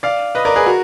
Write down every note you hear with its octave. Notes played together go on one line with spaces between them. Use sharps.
D5 F5
B4 D#5
A#4 D5
G#4 B4
F#4 A#4